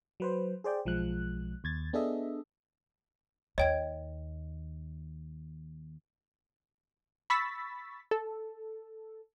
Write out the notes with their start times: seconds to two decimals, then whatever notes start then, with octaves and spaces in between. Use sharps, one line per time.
0.20 F#3 B4 C5
0.64 G#4 C5 D5 G5
0.85 B1 F3 G#3 F#6
1.64 D#2 G#6 A6
1.93 B3 D4 G#4 A4 D#5 E5
3.58 D#2 C#5 D#5 G5 G#6
7.30 B5 C#6 E6 A6 B6
8.11 A4